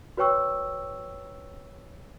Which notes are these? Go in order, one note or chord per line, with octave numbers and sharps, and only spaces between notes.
F#4 B4 C#5 G5 C#6 E6